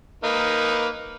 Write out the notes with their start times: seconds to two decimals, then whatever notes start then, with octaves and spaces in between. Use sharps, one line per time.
0.24 A#3 D#4 B4